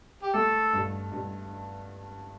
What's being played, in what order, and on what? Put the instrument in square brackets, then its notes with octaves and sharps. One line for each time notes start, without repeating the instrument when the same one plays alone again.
[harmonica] G4
[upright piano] A3 [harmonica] A4
[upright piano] G2
G2